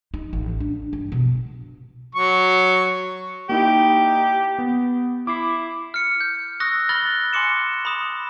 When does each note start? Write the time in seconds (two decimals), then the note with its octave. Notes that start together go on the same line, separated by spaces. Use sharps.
0.14 D#4
0.33 A1
0.60 D4
0.93 G2
1.12 B2
2.15 F#3 C#6
3.49 A#3 D#4 E4 G4
4.59 B3
5.27 E4 D6 C7
5.94 F6 C#7
6.21 G6
6.60 C#6 D#6 E6 F#6 A#6
6.89 B5 F6 F#6 A6 G7
7.33 G#5 C6 D6 C#7 E7
7.85 B5 D#6 E7